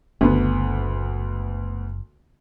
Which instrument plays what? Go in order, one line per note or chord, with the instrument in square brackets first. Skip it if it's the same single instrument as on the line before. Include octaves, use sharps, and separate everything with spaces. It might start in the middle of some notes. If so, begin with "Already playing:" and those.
[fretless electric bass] F#1 [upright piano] D2 B3